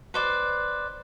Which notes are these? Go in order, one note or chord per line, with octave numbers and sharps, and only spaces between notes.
B4 C5 D5